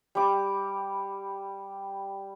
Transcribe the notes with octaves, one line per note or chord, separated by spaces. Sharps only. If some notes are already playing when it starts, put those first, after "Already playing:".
G3 D6